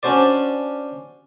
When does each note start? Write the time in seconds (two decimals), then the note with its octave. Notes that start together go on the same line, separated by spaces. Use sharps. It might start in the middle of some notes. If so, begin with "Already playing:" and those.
0.03 C#4 D4 F#4 C5 D5